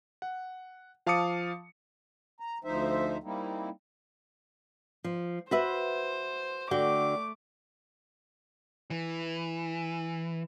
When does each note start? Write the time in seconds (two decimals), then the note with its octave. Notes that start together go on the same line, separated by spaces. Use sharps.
0.22 F#5
1.06 F3 F5 A5 D6 D#6 C#7
2.40 A#5
2.64 D2 F3 D#4 C5 E5
3.24 G3 A#3 C4 D#4 E4
5.04 F3
5.51 F#4 B4 C5 E5
6.71 D3 A3 F#4 G5 D6
8.90 E3